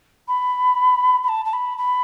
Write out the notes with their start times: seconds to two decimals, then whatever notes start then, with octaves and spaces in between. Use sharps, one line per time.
0.28 B5
1.23 B5
1.28 A5
1.45 A5
1.53 B5
1.77 B5